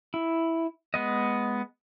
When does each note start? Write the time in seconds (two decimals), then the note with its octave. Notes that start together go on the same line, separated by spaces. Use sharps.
0.14 E4
0.94 G#3 B3 D#5